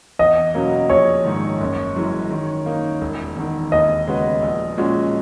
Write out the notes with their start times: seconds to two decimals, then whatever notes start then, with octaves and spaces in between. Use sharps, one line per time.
0.19 E2 D#5
0.54 B2 F#3 A#3 C#4
0.89 A#1 C#5
1.25 G#2 D#3
1.60 F#1
1.96 F#2 E3 G#3
2.30 D#3
2.66 A#3 D#4
3.01 E1
3.36 E2 D#3
3.72 D#2 D#5
4.07 C#3 G#3 B3 F#4
4.42 A#1
4.78 A#2 G#3 C#4 F#4